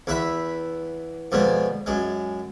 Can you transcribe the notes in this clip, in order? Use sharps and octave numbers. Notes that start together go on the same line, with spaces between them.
E2 B4 E5 B5
F2 B2 G#3 D4
F#2 G#3